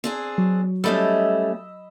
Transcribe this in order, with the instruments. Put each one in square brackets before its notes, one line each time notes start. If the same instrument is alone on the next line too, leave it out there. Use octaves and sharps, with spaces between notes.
[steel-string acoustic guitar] C4 D4 G#4
[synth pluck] F#3
[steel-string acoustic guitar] G3 A3 C#4 [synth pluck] D#5 B5 E6